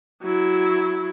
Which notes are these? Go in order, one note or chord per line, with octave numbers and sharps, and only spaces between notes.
F#3 E4